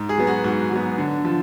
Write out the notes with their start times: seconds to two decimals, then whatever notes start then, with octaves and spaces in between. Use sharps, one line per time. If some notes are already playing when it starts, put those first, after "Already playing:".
Already playing: G#2
0.09 G#4
0.18 F#3 B3
0.27 F#4
0.44 G#2 F#4
0.72 F#3 B3
0.98 D3
1.25 F3